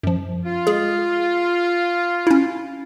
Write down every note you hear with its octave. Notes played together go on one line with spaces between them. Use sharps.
F#2 F3
F4
G#3 G#4
C#4 E4